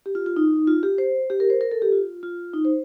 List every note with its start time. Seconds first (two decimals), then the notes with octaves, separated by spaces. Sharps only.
0.06 G4
0.15 F4
0.26 F4
0.36 D#4
0.67 F4
0.83 G4
0.98 C5
1.30 G4
1.40 A#4
1.50 C5
1.61 A#4
1.71 A4
1.82 G4
1.92 F4
2.23 F4
2.54 D#4
2.65 C5